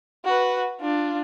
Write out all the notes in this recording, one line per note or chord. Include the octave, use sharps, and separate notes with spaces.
F#4 B4
D4 F4